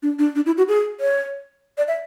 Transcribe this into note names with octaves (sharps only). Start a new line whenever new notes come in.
D4
D4
D4
E4
F#4
G#4
C#5
D5
E5